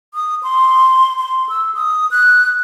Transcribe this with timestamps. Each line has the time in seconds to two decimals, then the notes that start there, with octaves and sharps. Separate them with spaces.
0.14 D#6
0.43 C6
1.19 C6
1.49 E6
1.75 D#6
2.11 F#6